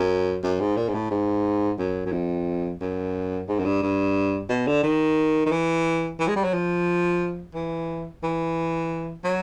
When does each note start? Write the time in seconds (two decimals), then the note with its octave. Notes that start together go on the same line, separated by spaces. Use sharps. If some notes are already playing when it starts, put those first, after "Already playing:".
Already playing: F#2
0.43 F#2
0.60 G#2
0.77 A#2
0.88 G#2
0.94 A2
1.11 G#2
1.79 F#2
2.06 F#2
2.12 F2
2.81 F#2
3.49 G#2
3.59 F#2
3.65 G2
3.82 G2
4.49 B2
4.67 D3
4.83 D#3
5.46 D#3
5.52 E3
6.20 E3
6.28 G#3
6.36 G3
6.44 F#3
6.54 F3
7.54 E3
8.23 E3
9.24 F#3